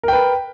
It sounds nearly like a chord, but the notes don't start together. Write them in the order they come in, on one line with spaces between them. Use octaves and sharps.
A#4 G5 B4